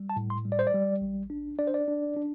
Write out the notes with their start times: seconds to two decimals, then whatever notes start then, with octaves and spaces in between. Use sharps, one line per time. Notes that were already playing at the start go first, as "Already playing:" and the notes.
Already playing: G3
0.10 A5
0.16 A2
0.30 C6
0.45 G3
0.52 D5
0.59 C5
0.67 D5
0.74 G3
1.01 A1
1.30 D4
1.58 D4 D5
1.67 C5
1.74 D5
1.88 D4
2.16 D4